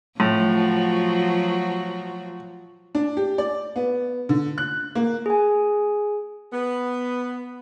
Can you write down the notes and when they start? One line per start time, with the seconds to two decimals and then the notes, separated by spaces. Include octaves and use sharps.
0.20 A2 F3 F#3 F#4
2.95 D4
3.17 G4
3.38 D5
3.76 B3
4.29 D3
4.58 F#6
4.95 A#3
5.26 G#4 G#5
6.52 B3